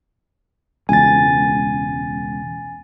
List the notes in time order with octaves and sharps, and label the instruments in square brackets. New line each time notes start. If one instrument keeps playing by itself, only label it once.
[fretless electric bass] E1 C#2 [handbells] G#5 A6